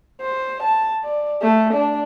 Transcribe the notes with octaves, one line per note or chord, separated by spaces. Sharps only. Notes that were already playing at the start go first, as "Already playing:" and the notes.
C5
A5
D5
A3
D4